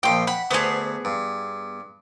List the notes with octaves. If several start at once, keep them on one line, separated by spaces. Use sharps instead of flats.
A#1 F3 G5 C6
F#5 B5
D2 B3 G#4 C5 A5
G2